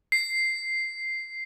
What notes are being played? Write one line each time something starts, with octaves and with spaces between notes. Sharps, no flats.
C7